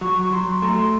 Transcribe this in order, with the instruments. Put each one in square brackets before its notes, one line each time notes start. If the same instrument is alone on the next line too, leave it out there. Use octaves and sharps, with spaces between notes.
[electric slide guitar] F#3 [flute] C#6
[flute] C#6
[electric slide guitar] F#3 [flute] C6
[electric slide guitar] A3 [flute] A#5
[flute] C6